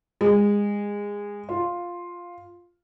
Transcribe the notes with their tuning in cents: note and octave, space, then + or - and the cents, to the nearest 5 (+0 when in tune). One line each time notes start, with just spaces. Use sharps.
G#3 -20
F4 +5